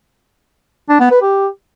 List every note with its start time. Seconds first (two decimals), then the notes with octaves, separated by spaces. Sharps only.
0.89 D4
1.00 B3
1.11 B4
1.22 G4